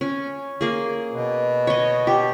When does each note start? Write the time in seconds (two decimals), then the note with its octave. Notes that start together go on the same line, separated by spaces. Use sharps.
0.01 C#4
0.61 A#3 G#4
1.13 B2
1.67 C#5 D#5
2.07 G4